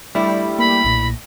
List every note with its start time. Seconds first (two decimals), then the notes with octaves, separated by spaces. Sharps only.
0.15 G3 A3 D4 E4
0.59 A#3 B5
0.84 B1 A#2 A#6